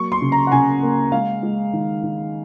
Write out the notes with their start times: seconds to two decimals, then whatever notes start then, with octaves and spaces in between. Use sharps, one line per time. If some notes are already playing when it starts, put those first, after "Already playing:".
Already playing: F#3 A#3 C#6
0.12 C6
0.21 C#3
0.32 A#5
0.47 F#5
0.52 C#3 G#5
0.83 A#3
1.12 G#3 F5
1.43 G#3
1.73 D#3
2.03 D#3